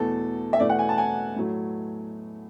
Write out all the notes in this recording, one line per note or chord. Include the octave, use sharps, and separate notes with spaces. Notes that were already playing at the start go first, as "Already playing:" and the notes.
Already playing: E2 B2 A3 A4
E5
E2 B2 A3 D5
F#5
G#5
A5
G#5
A2 F#3 A3